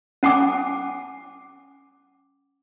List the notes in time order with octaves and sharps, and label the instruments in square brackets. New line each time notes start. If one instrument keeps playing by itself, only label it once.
[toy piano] C#4 F#5 G#5 D6